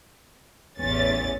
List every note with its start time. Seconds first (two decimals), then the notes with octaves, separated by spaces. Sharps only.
0.79 A1 E2 C#4 A6